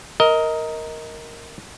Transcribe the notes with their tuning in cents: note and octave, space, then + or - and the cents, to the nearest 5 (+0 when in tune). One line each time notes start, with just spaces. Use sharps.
A#4 +0 D#5 +20